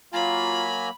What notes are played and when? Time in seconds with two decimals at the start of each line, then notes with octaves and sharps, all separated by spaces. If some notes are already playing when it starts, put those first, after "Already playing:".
0.13 F#3 A#3 F4 G#5 A#5 B5